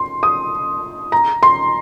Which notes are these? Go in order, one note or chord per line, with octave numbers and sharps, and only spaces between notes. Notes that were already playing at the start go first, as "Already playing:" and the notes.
Already playing: C6
D#6
A#5
C6